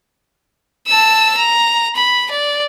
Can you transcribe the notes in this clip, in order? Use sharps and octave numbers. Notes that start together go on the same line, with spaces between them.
A5 E6
A#5
B5
D5